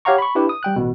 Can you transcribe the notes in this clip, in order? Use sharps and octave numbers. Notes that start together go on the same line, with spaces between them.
G4 C#5 F5 F#5 A#5 C#6
B5 C#6
D4 E4 G4 B4
D#6
G3 G5 F#6
A1 B2